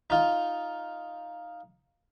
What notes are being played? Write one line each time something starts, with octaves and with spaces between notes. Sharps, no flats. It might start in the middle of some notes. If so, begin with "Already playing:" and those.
D#4 F4